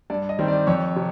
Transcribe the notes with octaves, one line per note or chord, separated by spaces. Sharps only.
G2 D5
D#5
D#3 G3 C4
D5
F2 C#5
C3